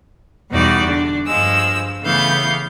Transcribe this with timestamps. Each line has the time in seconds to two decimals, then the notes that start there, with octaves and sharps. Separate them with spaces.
0.50 E2 B2 G3 D#4 F#4 D5
0.84 D3 D4
1.27 G2 F3 G#3 E6
2.02 C#3 E3 A3 B3 F5 G6